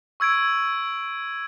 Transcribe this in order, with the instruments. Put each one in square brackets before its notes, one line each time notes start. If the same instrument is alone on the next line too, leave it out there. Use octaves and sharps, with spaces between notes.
[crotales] C#6 E6 G#6 D7